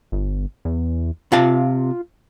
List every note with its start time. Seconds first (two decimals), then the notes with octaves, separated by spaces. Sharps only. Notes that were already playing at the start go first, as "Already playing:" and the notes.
0.12 G1
0.65 E2
1.32 C3 F4 F5 A5